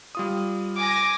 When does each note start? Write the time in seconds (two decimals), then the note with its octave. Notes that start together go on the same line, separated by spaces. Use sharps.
0.15 G3 F4 D#6
0.77 G#5 D6 A#6